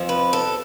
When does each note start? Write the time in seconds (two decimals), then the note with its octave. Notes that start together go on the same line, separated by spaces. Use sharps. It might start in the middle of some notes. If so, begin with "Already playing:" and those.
Already playing: F2 F3
0.09 B4
0.33 A4